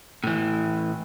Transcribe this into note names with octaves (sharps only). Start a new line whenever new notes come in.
A2 E3